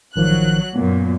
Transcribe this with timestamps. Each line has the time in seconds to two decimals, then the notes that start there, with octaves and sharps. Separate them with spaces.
0.16 A1 D#3 F3 F#3 F#6
0.76 F#2 A#2 B3